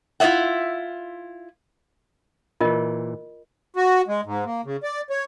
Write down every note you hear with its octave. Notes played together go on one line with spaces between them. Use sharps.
E4 F4 C5 C#5 E5 F#5
A#2 E3 F4 A#4 D#5
F#4
G#3
G#2
A#3
C#3
D5
C#5